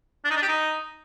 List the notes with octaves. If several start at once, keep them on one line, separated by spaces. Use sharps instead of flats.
D4
D#4
D4
G4
D#4